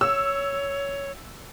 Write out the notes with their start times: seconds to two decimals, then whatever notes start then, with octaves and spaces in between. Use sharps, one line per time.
0.01 C#5 E6